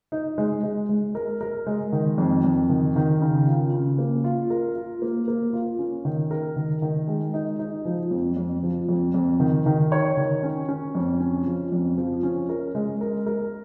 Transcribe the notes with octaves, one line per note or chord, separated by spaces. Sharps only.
D#4
G#3
G#3
G#3
A#4
A#4
G#3
D#3
F2
F2
D#3
D#3
C#3
F4
C#3
A#3
F4
A#4
F4
A#3
A#3
F4
C#4
D#3
A#4
D#3
D#3
G#3
D#4
D#4
F3
F2
F2
F3
F2
F2
D#3
D#3
C#5
D#3
C#4
C#4
F2
C#4
F3
F2
F3
C#4
A#4
G#3
A#4
A#4